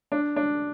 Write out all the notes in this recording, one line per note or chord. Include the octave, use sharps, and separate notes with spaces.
D4
D4